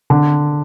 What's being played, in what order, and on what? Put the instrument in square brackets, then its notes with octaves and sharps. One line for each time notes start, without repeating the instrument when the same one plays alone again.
[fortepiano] D3